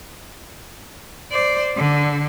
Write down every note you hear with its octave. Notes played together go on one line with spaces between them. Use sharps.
C5 D5
D3